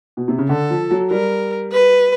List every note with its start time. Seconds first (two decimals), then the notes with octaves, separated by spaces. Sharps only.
0.17 B2
0.28 C3
0.38 C#3
0.49 D3 A4
0.70 F3
0.91 F#3
1.11 G3 A#4
1.72 B4